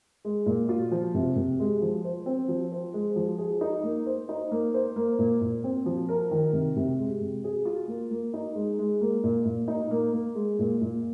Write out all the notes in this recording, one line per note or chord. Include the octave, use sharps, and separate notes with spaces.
G#3
A#2
F4
F3
C3
C3
G#3
F3
C5
C4
F3
C5
G#3
F3
G#4
D#4
A#3
C5
D#4
A#3
C5
A#3
A#2
A#2
C4
F3
A#4
D#3
C3
C3
G#3
C3
G#4
F4
A#3
A#3
D#4
G#3
G#3
A#3
A#2
A#2
D#4
A#3
A#3
G#3
A#2
A#2